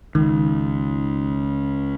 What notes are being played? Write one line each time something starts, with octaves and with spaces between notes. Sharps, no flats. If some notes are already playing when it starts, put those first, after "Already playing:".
C#2 D#3